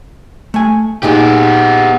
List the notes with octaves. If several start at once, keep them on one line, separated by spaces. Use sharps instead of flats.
A3 G#5
A#2 B3 D#4 G4 G#4